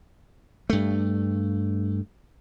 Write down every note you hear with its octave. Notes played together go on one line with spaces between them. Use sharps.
G2 A3